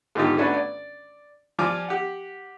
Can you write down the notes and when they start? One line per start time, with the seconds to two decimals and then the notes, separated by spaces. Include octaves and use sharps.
0.15 G#2 D3 D#3 D#4 F4 G4
0.37 A3 C#4 D4 F#4 B4
0.54 D5
1.59 F3 G3 F4 G#5 D6
1.88 G4 F#5